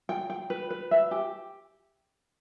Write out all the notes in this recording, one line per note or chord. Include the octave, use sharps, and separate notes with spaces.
G5
G5
B4
B4
E5
G4